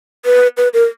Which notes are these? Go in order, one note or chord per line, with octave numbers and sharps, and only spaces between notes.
B4
B4
A#4